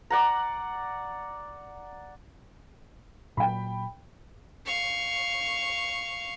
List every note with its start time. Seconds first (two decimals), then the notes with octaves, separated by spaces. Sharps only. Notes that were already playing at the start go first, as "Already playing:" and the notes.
0.10 D5 F#5 A#5
3.37 A#2 F#3 G5 B5
4.66 F5 C#6